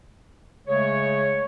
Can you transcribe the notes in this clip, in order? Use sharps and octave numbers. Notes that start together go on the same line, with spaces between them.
C#3 G#3 A3 G#4 C#5